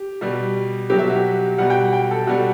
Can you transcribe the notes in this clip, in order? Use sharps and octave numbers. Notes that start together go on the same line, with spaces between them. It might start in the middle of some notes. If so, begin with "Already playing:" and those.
Already playing: G4
B2 G3
B2 F#3 G4
E5
F#4
G4
B2 G3 F#5
G5
G5
A4
B2 G3 F#4